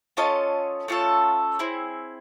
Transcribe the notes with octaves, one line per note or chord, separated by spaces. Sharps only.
C#4 F4 A4 C#5 D#5
A3 C#4 F4 A4
C4 E4 G#4